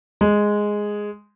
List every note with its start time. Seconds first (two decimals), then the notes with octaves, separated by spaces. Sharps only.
0.21 G#3